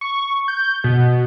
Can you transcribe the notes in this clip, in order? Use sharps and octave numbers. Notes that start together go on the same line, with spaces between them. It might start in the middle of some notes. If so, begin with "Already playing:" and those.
C#6
G6
B2